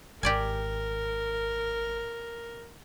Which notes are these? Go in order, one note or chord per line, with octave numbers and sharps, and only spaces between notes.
G#1 G4 A#4 D5 G#5